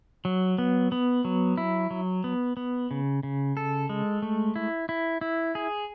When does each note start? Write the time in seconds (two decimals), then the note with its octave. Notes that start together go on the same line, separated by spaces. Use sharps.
0.25 F#3
0.58 B3
0.92 B3
1.25 F#3
1.58 E4
1.91 F#3
2.24 B3
2.57 B3
2.91 C#3
3.23 C#3
3.57 A4
3.89 G#3
4.22 A3
4.56 E4
4.89 E4
5.21 E4
5.55 G#4